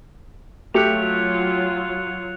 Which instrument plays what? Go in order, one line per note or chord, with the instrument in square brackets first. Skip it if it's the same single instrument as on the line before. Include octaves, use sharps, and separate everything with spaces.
[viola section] F#3 F4 [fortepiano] A3 G4 [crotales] F#6 C#7 F7